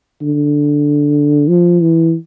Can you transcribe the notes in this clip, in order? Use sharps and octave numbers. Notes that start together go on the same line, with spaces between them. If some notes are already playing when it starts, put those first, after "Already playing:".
D3
F3
E3